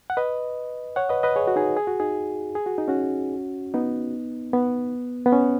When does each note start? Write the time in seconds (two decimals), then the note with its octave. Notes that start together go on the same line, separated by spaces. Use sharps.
0.10 F#5
0.17 B4 D#5
0.96 C#5 F#5
1.09 B4 D#5
1.23 B4 D#5
1.36 G#4 C#5
1.47 F#4
1.56 D#4 G#4
1.77 G#4
1.87 F#4
2.00 D#4 G#4
2.55 G#4
2.66 F#4
2.78 D#4
2.88 C#4 F#4
3.74 B3 D#4
4.53 B3
5.26 B3
5.32 C#4